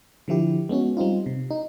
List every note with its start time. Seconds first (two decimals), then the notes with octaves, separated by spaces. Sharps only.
0.28 D3 F3 E4 G4
0.69 G#3 B3 C#4 F#4
0.97 G3 C4 D#4 F4
1.26 C3
1.51 D#4